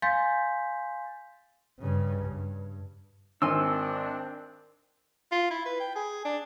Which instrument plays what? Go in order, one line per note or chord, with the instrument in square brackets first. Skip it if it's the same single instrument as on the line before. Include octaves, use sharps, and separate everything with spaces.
[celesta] F5 G#5 C6 G6 A6 B6
[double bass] G2 C#3
G2
[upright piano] G#1 [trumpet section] C4 D4 [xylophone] A#4 G#5 F6 [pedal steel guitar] C6 E6
[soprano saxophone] F4
E4
B4
G5
G#4
D4